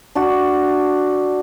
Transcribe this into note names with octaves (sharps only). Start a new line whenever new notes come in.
D4 F#4